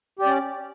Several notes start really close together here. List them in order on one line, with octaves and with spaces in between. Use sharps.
G4 D5 C#4